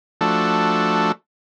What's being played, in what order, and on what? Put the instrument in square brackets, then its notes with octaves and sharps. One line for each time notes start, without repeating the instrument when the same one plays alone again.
[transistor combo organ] F3 A3 D4 F#4 A4